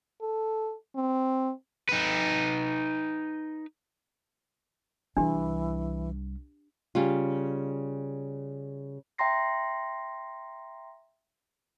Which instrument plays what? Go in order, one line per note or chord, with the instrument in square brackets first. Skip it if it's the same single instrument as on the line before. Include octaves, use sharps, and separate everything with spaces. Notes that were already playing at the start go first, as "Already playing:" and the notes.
[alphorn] A4
C4
[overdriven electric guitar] D#4 B4
[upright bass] C2 G3 [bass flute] E3 [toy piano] D4 G4
[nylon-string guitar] C#3 G3 F4
[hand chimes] E5 G5 A#5 C6 A#6 C7